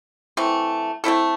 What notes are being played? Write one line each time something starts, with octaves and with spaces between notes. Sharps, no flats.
E3 A3 C4
A3 C4 E4 A4